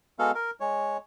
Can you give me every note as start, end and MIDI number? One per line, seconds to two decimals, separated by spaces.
0.19 0.31 56
0.19 0.31 59
0.19 0.31 66
0.19 0.31 69
0.19 0.31 77
0.35 0.51 70
0.60 0.97 56
0.60 0.97 73